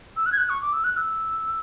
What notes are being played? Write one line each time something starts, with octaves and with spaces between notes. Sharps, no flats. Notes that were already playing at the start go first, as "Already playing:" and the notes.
E6
F#6
G#6
F#6
C#6
D6
E6
F#6
E6